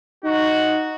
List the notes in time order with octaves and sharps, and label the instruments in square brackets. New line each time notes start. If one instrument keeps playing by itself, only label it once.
[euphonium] D#4 [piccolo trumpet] F#4